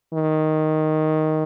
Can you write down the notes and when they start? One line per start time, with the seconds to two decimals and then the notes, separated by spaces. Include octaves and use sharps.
0.14 D#3